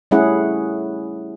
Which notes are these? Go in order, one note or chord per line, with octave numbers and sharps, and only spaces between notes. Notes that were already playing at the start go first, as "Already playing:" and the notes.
G3 A3 C#4 E4 G#4 F#5